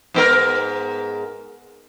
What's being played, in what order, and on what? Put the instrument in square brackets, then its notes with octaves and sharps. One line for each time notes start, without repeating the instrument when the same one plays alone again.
[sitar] G#2 B3 A#4